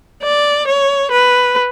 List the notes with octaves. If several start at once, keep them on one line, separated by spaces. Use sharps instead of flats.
D5
C#5
B4